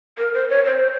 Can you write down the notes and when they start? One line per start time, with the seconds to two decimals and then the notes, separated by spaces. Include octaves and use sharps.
0.18 A#4
0.34 C5
0.49 C#5
0.65 C5